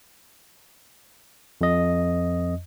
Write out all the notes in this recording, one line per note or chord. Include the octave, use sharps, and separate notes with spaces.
F2 D#5